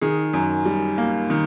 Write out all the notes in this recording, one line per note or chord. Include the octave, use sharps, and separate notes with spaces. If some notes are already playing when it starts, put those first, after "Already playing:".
D#3 G#4
F#2
G3
A#3
D#3